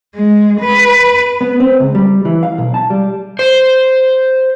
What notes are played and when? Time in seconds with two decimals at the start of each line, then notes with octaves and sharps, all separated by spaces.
0.15 G#3
0.61 B4
1.41 B3
1.60 C4
1.80 C#2
1.95 G3
2.25 E3
2.43 F5
2.58 B1
2.74 A5
2.90 G3
3.39 C5